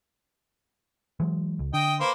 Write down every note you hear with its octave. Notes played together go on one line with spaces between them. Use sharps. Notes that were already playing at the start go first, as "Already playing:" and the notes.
E3 F#3 G#3
C#2
D3 D#5 G5
A#3 B4 C5